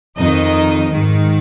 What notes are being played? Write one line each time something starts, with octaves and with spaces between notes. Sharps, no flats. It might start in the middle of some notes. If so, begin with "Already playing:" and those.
F2 D#3 D#4 D#5
G#2 D#3